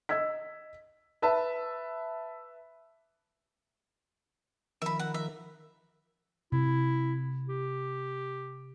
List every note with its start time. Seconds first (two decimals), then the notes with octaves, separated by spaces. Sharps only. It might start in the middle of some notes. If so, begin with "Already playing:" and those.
0.09 D#5 E6 G#6 B6
1.22 B4 E5 A5
4.82 D#3 F3 A#4 E5 B5
4.99 F#5
5.14 E5
6.52 C3 E4
7.48 G4